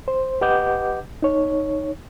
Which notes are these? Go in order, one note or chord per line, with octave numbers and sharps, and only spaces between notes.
C5
G4 B4 D#5 F#5 D6 G6
D#4 C#5